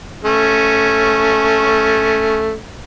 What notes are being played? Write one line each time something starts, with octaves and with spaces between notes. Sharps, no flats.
A3 C#4